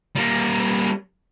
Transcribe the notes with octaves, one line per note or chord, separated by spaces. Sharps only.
G3 A#3